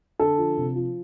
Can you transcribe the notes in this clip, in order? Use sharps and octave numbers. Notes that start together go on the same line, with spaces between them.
D3 A4
F3
C3
F3